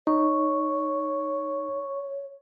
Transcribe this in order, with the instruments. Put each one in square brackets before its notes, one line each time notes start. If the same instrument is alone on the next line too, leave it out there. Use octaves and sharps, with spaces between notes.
[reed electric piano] D#4 [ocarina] C#5 [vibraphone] C#6